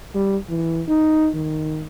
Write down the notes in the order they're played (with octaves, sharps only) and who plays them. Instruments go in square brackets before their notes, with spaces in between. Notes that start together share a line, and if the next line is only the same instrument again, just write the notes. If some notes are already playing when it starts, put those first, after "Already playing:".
[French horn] G3
E3
D#4
D#3